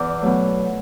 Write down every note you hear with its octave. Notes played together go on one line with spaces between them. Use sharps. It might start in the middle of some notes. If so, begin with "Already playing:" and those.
Already playing: E2 D5
B2 F#3 A3